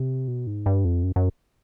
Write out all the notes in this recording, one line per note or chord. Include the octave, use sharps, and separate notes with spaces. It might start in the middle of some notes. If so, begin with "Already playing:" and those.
Already playing: C3
B2
G#2
G2
F2
F#2
F#2